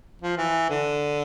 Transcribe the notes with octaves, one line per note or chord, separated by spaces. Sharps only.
F3
E3
D3